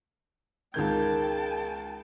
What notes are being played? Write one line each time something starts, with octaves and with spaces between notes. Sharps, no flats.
C#2 D#3 G#4 A#4 G5 A5 G6 G#6